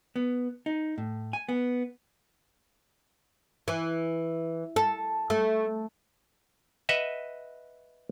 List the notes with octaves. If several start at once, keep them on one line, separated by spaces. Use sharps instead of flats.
B3
D#4
A2
G#5
B3
E3
A4
A3
B4 D#5 E5 F#5